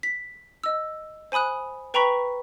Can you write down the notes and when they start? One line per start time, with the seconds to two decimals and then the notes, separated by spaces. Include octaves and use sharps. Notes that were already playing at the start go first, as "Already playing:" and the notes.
0.03 B6
0.64 D#5 E6
1.32 C5 G#5 B5 D#6 F#6
1.94 B4 G5 A#5 B5 C#6 B6